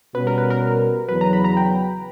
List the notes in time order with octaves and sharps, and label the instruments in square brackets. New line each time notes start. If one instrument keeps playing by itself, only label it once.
[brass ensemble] B2 G3 C#4 F#4 [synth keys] B4
[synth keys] A#4
B4
A#4
[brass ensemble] E2 C#3 F#3 [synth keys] B4
[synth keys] A#5
B5
A#5
G5